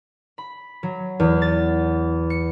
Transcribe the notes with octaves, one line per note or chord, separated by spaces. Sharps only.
B5
F#3
E2
A6
C#7